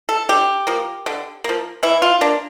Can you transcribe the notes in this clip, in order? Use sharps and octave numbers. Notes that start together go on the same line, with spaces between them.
A4
D3 G4
F3 A#3
D3
F3 A#3
E3 E4
F4
A#3 D4